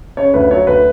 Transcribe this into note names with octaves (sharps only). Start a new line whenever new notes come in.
C#3 C#5
D2 B4
F#3 C#5
D2 B4